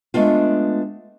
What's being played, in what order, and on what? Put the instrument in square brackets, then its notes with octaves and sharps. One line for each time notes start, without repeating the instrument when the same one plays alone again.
[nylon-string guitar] G#3 A3 B3 D4 F4